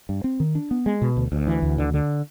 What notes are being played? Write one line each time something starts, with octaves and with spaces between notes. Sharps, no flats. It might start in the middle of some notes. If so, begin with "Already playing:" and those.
G2
C4
D#3
D4
B3
G#3
B2
D2
D2
E3
D2
D3
D3